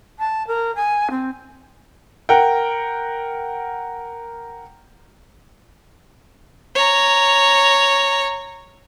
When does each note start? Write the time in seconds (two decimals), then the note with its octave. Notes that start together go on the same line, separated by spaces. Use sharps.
0.18 A5
0.47 A#4
0.75 G#5
1.10 C4
2.29 A#4 F#5 G5
6.75 C#5 A#5